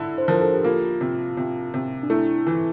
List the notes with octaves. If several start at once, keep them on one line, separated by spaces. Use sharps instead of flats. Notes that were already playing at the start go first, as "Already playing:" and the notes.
Already playing: D3 E4
C5
F3 A#4
A4
G4
A#3 F4
C3
C3
C3
D4
A3 E4
E3